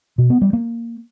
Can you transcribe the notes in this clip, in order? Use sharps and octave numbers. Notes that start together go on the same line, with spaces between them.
B2
B3
G3
A#3